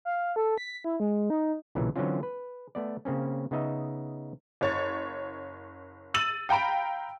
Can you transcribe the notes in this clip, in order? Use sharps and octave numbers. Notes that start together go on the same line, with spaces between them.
F5
A4
B6
E4
G#3
D#4
B1 A#2 C#3 E3 F#3
D3 E3 F#3 C4 C#4 F4
B4
A3 B3 D5
C#3 A#3 C4 C#4
C#3 B3 D#4 D#5 E5
F#1 C#5 A6
E6 A6 D#7 F#7
F5 G5 A#5 B5 D7